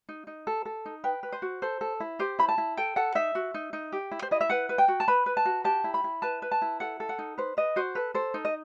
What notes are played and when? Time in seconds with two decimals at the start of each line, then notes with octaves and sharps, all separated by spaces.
0.09 D#4
0.27 D#4
0.47 A4
0.65 A4
0.85 D#4
1.04 B4 G5
1.23 B4
1.32 C5
1.42 F#4
1.62 A4 C5
1.81 A4
2.00 E4
2.19 G4 C5
2.39 E4 B5
2.48 A5
2.58 E4
2.77 A4 G5
2.96 A4 F#5
3.15 D#4 E5
3.35 F#4
3.54 D#4
3.73 D#4
3.92 G4
4.11 E4
4.22 C5
4.31 E4 D#5
4.41 E5
4.50 B4 F#5
4.69 B4
4.78 G5
4.88 F#4
5.00 A5
5.08 B4 B5
5.26 B4
5.37 A5
5.45 F#4
5.64 G4 A5
5.84 E4
5.94 B5
6.04 E4
6.22 B4 A5
6.42 B4
6.51 A5
6.62 E4
6.80 A4 F#5
7.00 A4
7.09 F#5
7.19 D#4
7.38 B4 C5
7.57 B4 D#5
7.76 F#4 C5
7.95 A4 B4
8.14 A4 C5
8.34 D#4
8.45 D#5